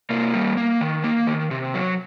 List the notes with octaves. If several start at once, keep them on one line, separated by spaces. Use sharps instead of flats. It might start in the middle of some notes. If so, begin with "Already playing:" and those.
C3 A#3
G3
A#3
D#3
A#3
D#3
C3
F#3